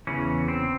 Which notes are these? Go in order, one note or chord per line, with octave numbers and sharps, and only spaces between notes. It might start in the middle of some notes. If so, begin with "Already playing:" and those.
E2 C#3 E3 C#4
C4